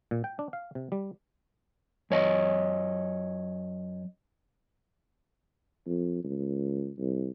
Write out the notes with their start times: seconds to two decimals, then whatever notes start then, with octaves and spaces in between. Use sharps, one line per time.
0.11 A#2
0.24 G5
0.39 D4
0.53 F5
0.75 C3
0.92 G3
2.10 F#2 C#5 D#5
5.86 F2
6.24 C#2
6.98 C2